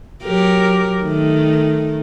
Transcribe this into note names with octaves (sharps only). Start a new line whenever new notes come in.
F#3 G4 A#4
D#3 A3